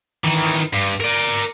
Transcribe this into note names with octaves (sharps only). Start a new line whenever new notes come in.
D#3 E3
G2
A#4 D5